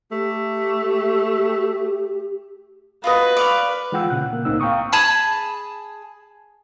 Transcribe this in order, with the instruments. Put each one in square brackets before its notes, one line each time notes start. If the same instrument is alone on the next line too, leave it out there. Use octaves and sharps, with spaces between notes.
[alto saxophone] A3 [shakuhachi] G4
[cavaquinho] F4 F#4 D#5 [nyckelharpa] B4
[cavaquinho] D5 F5 C#6
[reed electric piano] E3 G#3 F4 F#5 G5 E6
A#2 C#3 F#5 F#6
A#3
C2 A2 A#3 C4 D#4 E6
F5 G5 A#5 C#6 D#6
[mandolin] G#4 A5 B5